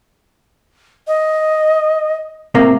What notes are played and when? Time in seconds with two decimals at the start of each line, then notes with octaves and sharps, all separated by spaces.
1.07 D#5
2.55 A2 C3 A#3